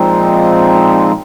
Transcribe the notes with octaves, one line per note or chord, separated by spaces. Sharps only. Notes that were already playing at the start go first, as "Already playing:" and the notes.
Already playing: A#2 F3 G#3 C4 D#4